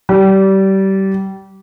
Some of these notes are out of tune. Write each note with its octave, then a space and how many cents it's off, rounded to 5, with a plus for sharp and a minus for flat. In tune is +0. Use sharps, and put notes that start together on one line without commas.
G3 -25